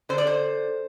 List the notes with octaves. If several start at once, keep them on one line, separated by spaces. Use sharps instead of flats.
D3 C5
D5
C5